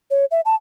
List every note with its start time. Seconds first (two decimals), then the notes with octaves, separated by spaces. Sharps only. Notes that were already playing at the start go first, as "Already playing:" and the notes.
0.11 C#5
0.31 E5
0.45 A5